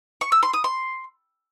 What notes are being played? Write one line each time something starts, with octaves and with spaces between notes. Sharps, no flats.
C#6
E6
C6
D#6
C6